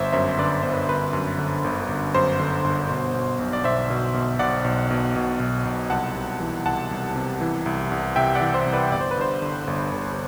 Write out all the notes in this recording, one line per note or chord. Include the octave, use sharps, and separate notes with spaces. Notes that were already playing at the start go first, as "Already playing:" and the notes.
Already playing: G1 C5 E5
F#2 C5 E5
D3 B4 D5
G1 C5
B4
G1 B4
F#2
D3
G1
G1
F#2 C5
D3
G1
B2
B2
B1
D5
B1 C5 E5
B2
B2
B1 D5 F#5
B1
B2
B2
B1
B1
C2 F#5 A5
C3
E3
C2 F#5 A5
C2
C3
E3
C2
C2
C3 E5 G5
D5 F#5
E3
C5
C2
B4 D5
G1 D5
C5
B4
G2 C5
D3
G1
G1